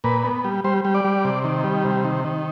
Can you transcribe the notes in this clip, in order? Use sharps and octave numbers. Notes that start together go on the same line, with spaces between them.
A#2 B4
B3
G3
G3 C5
G3
D5
G3
C3
D#3
G3
C3
D#3
D#3